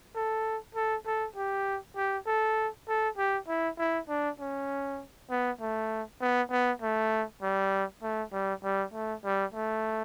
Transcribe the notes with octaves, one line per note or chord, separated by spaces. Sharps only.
A4
A4
A4
G4
G4
A4
A4
G4
E4
E4
D4
C#4
B3
A3
B3
B3
A3
G3
A3
G3
G3
A3
G3
A3